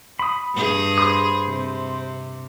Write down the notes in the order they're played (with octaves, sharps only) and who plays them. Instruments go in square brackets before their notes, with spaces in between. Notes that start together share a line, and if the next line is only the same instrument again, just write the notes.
[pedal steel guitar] B5 D#6
[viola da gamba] G2 G#4
[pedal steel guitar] C5 B5 D#6
[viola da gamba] C3